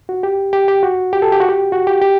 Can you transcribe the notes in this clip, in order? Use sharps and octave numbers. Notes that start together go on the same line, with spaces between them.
F#4
G4
G4
G4
F#4
G4
A4
G4
F#4
G4
F#4
G4
G4